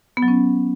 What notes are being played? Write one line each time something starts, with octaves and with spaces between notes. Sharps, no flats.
B3
F#3
C#4